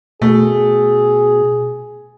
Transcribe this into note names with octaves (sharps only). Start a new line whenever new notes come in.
B2 A3 G#4